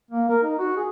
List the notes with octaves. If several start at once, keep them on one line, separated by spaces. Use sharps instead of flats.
A#3
A#4
D#4
F#4
G#4